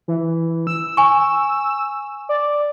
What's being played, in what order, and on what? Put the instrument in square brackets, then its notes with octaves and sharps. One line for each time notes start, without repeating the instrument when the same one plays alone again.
[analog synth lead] E3
E6
[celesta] G#5 C#6
[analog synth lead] D5